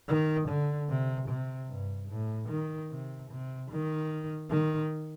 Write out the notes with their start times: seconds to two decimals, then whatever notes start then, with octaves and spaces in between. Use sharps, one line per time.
0.08 D#3
0.49 D3
0.89 C3
1.29 C3
1.69 G2
2.09 A2
2.49 D#3
2.91 C3
3.31 C3
3.71 D#3
4.51 D#3